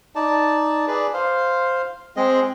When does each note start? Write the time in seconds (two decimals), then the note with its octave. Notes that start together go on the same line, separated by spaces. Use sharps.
0.15 D#4 D5 A5
0.88 G#4 B4 D5
1.14 C5 F5
2.16 G#3 C4 G#4 D#5